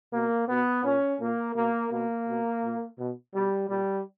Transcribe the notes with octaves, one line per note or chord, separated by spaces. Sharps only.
B2 A#3
B2 B3
A#2 C#4
A#2 A#3
B2 A#3
B2 A#3
B2
A#2
B2
B2 G3
A#2 G3